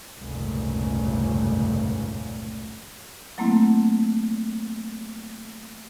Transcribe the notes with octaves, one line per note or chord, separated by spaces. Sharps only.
F1 C#2 G2 A#2 C#3
F#3 A3 A#3 C4 E4